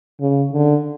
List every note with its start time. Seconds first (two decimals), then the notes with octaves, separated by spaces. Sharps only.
0.21 C#3
0.53 D3